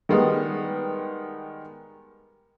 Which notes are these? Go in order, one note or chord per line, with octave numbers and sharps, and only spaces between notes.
D#3 G3 G#3 B3